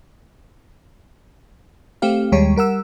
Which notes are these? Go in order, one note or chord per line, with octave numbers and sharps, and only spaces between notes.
A3 C4 G4 F5
D#2 G3 G#3 G4 C#5
G3 A#4 F#5 E6